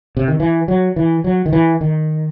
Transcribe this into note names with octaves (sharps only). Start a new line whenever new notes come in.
C3
D#3
E3
F#3
E3
F#3
D#3
E3
D#3